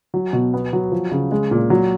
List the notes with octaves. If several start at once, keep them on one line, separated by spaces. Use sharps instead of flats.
F#3
B2
B3
F#3
F3
C#3
G#3
A#2
F#3